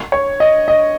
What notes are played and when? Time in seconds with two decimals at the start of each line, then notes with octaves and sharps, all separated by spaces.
0.12 C#5
0.40 D#5
0.68 D#5